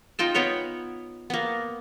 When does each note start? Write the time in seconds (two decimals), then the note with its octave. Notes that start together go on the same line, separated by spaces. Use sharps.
0.19 D#4 F4 G5 A5
0.34 B3 B4 C#5 G5
1.30 A#3 B3